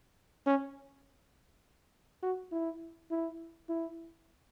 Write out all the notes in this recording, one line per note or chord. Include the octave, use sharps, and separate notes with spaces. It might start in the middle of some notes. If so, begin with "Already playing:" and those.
C#4
F#4
E4
E4
E4